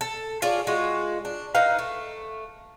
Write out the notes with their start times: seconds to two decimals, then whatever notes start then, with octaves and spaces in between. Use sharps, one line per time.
0.01 A4
0.42 F4 G#4 C#5 D5
0.67 G#3 F4 F#4
1.25 D4
1.55 D#4 B4 D#5 F5
1.79 A3